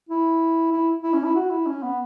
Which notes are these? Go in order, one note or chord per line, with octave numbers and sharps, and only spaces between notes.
E4
E4
E4
C#4
E4
F#4
E4
C#4
B3